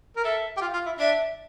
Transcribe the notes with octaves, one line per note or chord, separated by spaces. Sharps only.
A#4
A4 E5
G4
F4
F4
E4
D4 E5